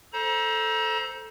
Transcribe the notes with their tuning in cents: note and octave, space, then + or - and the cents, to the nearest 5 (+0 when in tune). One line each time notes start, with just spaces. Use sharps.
A4 +0 C5 +0 A#5 +35